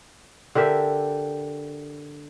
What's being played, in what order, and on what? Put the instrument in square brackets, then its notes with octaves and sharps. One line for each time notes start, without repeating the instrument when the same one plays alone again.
[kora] D3 G4 A#4 E5